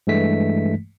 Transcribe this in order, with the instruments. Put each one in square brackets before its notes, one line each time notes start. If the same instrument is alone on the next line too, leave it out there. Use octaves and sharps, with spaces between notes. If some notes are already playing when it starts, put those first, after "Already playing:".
[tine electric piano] G2 E3 G#3 A3 B6